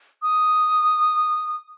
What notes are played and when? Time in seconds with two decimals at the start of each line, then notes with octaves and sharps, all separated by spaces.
0.22 D#6